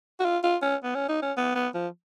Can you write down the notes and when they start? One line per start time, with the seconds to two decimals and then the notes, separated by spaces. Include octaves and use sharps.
0.20 F#4
0.25 F4
0.43 F4
0.62 C#4
0.83 B3
0.95 C#4
1.09 D#4
1.22 C#4
1.37 B3
1.55 B3
1.74 F3